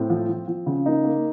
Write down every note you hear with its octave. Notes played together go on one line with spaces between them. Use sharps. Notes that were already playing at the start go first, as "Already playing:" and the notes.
Already playing: A2 C4
F3
F3
F3
C#3
A#3 D#4
A#3